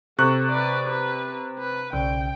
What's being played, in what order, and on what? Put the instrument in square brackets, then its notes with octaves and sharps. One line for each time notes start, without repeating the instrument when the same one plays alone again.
[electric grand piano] C3 C#6 F#6 [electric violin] A4
[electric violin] B4 D5
B4
B4
[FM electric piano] B1 C#3 [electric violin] G5